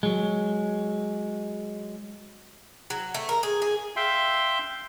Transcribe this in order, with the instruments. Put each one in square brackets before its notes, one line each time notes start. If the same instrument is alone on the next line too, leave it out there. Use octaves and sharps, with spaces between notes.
[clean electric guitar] F#3 G#3
[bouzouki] F#3
A3
A#4
G#4
G#4
[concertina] E5 F5 G5 C6